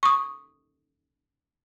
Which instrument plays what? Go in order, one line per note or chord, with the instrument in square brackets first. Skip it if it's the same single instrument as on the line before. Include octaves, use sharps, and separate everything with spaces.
[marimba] C#6 D#6